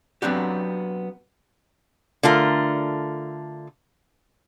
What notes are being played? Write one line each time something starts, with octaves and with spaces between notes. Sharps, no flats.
F#3 B3 C4 D4 F#4 G4
D3 A3 F4 A#4